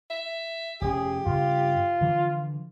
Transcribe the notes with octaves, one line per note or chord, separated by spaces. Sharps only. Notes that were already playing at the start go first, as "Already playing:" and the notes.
E5
F1 C#4 G4 G#4
G2 C#3 F4
D3 E3 F3